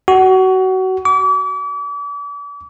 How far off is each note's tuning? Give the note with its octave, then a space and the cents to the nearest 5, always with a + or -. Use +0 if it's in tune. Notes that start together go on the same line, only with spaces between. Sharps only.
F#4 +25
D6 -40